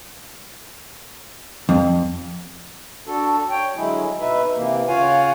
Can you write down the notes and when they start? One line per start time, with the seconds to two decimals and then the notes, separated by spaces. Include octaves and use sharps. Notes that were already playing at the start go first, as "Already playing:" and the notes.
1.69 F2
3.07 D4 F#4 A4
3.49 C#5 G5
3.76 D3 F#3 G#3 E4 G#4
4.20 B2 D#4 B4 E5
4.55 C3 E3 A#3
4.87 C#3 F4 C#5 F5 F#5 G#5